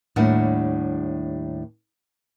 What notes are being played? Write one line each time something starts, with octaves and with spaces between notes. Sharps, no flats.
D#2 A2 G3 D4 A#4 F#5